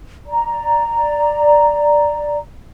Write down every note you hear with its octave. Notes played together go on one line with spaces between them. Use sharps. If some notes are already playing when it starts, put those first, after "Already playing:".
D5 A#5